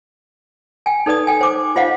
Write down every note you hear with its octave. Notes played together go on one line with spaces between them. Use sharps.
G5 G#5
D#4 A4 B4 D5 D#6
A4 G5 G#5
C5 D6
F4 C5 D#5 F5 F#5